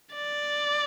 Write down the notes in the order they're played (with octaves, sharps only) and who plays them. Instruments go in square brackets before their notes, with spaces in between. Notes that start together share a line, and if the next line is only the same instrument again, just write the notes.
[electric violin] D5